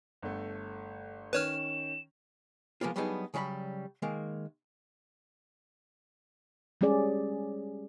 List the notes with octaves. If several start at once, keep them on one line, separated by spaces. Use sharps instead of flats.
G1 A3
D#3 C#4 B4 C#5 F6 E7
F3 G#3 A#3 B3 F4
F#3 G3 B3 D4 D#4 G#4
C#3 F#3 G3 F5 B5
D#3 G#3 A#3
G3 G#3 C#4 G#4 D5